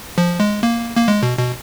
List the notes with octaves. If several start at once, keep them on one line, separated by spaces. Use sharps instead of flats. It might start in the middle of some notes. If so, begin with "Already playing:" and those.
F3
G#3
A#3
A#3
G#3
B2
B2